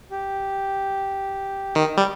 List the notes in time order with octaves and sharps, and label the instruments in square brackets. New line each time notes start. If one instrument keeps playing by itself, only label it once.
[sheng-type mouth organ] G4
[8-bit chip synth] D#3
G3